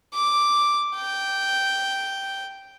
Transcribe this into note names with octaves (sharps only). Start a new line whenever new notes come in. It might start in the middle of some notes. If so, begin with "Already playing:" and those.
D6
G5